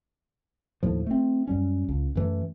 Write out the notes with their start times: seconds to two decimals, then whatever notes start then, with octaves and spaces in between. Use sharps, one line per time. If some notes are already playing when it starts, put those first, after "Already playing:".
0.83 D#2 A2 F3
1.07 A3 C4
1.48 F#2 G3 C#4
1.89 C#2
2.15 F#2 E3 A3